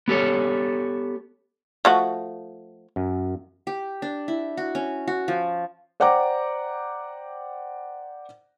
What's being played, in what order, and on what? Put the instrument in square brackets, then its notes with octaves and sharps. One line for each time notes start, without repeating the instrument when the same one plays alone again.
[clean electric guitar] B3 G4 A4 C#5
[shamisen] F3 A3 F#4
[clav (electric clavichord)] F#2
[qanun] G4
D4
E4
F#4
C#4
F#4
F3
[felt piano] C5 D5 F#5 G5 A#5 D6